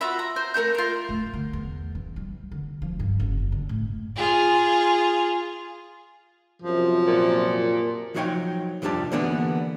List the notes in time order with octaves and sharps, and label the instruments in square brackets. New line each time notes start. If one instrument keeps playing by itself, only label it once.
[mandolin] F4 F#4 E5 B5
A#5
C5
A3 A#4 E5 G6
F4 A#4
[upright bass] A3
D3
E2
E3
G3
D3
F3
G2
F#1
D3
A2
[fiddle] F4 G#4
[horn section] F#2 C3 F3
[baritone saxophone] A#2
[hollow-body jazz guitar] F3 F#3 D#4 C#5 F5 G5
C2 F2 G3 D4 G4 A5
D3 E3 A#3 B3 D4